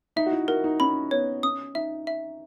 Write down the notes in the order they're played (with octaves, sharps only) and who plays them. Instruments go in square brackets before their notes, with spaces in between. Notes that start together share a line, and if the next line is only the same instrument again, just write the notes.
[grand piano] D#4 [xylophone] E5
[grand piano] F#4
E4
[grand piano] F#4 [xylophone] A#4
[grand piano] D#4
[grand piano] C#4 [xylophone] B5
[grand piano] B3 [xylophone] C#5
[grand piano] C#4 [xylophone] D#6
[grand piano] D#4 [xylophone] E5
[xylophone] E5